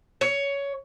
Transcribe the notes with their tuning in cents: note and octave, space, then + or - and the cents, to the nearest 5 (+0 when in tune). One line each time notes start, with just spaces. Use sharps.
C#5 +15